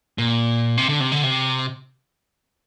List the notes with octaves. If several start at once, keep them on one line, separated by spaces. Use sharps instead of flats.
A#2
C3
D3
C3
D3
C3